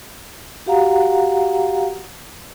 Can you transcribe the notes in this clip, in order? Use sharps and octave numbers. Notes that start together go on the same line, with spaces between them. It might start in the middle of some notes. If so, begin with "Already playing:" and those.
F#4 G4 F5 F#5 A#5